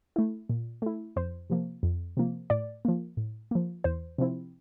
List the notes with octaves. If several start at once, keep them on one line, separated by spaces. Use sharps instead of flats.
A3 E4
A#2
A3 E4
F2 C5
C3 F3 A#3
F2
C3 F3 A#3
A2 D5
F3 A#3
A2
F3 A#3
E2 C5
C3 F3 C4 E4